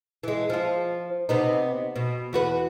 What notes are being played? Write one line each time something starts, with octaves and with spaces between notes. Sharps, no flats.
E3 G#3
F3 F4
C3 B3 D#4
B2
E2 F#4 B4